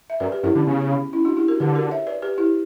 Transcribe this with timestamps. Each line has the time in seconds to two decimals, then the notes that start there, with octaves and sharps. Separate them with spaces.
0.10 E5
0.20 F#2 B4 D5
0.32 G4 B4
0.43 F#2 E4 G4
0.55 D3 C#4
0.67 C#3 B3
0.90 C#4
1.13 C#4 E4
1.25 D4 F#4
1.37 E4 G4
1.48 F#4 A#4
1.60 D3 G4 B4
1.75 F#4 A#4
1.91 C#5 E5
2.07 B4 D5
2.22 G4 B4
2.38 E4 G4